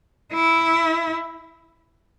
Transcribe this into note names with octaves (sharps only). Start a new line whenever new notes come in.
E4